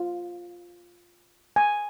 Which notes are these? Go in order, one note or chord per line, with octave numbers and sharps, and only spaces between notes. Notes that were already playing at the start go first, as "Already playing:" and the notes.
Already playing: F4
G#5